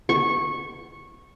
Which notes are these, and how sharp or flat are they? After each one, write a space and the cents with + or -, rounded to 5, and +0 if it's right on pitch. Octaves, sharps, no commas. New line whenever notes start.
C#6 -15